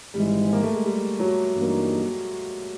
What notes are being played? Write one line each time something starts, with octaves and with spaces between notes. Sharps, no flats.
G#1 G#2 E3 G3 G#3
A#3
A3
G#3
G3
F#3
G2 E3 G3 A#3 D#4